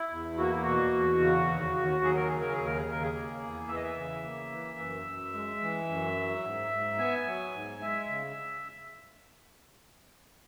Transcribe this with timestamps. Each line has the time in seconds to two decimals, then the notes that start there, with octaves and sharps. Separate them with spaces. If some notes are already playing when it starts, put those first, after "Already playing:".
Already playing: E4
0.10 E2
0.38 A#3 F#4
0.50 E4
0.63 B2 F#4
0.93 E2
1.20 C#3
1.48 D#2
1.76 D#2
2.03 F#3 G#4
2.16 A#4
2.28 C#3 G#4
2.41 A#4
2.53 G#4
2.58 D#2
2.65 A#4
2.78 G#4
2.86 C#3
2.91 A#4
3.03 G#4
3.13 A#3
3.41 E2
3.68 E3 E5
3.75 D#5
3.83 E5
3.96 C#3
4.23 A#3
4.51 E3
4.79 F#2
5.06 F#2
5.33 G#3
5.61 E3
5.88 F#2
6.16 F#3
6.43 G#2
6.71 G#2
6.99 B3 G#5
7.26 F#3
7.53 G#2
7.81 G#3 E5
8.09 C#3